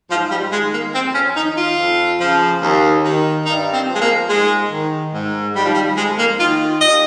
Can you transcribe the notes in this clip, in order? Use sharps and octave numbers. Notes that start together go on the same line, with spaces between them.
G#2 F3
G3
D#3 G#3
A#3
F2 C4
C#4
D#3 D#4
F4
F2
C#3 F3
D#2
D#3
G2 D#4
C4
F3
G#3
A#3
G#2 G#3
D#3
G#2
D#3 G3
F3
G3
F2 G#3
A#3
D#3 F4
D#2 D#5